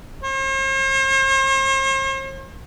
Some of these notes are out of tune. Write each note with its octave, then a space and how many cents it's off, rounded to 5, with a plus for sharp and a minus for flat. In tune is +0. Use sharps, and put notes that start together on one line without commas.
C5 +45